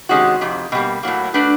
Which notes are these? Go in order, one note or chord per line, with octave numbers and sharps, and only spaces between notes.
C3 D#3 G#3 C#4 F#4
F2 C3
B2 G3 A#3
A2 F#3 A#3
A3 D4 F#4 B4 D5